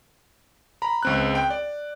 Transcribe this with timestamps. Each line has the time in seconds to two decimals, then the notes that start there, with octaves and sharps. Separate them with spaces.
0.82 A#5 B5
1.03 C#2 C4 F#6
1.35 G5
1.50 D5